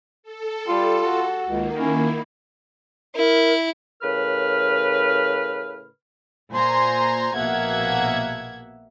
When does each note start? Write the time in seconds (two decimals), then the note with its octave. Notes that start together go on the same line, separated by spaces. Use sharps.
0.23 A4
0.68 G3 F4
1.06 F#4
1.47 C#2 D#3 A#3
1.79 C#4 E4
3.15 E4 A#4
4.02 A2 C#3 A#4 B4 F6
6.51 A#2 C5 G#5 A#5 C6
7.36 A#1 B2 A#3 E5 F#5 G#6